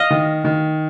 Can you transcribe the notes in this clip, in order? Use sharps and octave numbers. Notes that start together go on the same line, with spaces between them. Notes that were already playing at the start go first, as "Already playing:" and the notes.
Already playing: D#5 F5
D#3
D#3